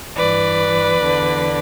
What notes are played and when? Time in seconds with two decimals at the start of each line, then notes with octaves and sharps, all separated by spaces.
0.15 G2 E3 B4 D5
1.00 E2 D3